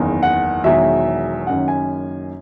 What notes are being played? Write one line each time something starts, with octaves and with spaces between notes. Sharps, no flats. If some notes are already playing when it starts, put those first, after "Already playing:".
Already playing: F#1 E2 D#3
F#5
E1 E2 D#3 F#3 E5
F#1 F#2 D#3 F#5
G#5